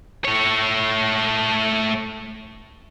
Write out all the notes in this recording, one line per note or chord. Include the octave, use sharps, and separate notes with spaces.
A3 C#5